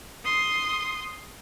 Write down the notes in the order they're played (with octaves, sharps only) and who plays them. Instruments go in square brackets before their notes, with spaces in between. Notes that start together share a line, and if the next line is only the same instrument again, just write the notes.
[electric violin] C6 D#6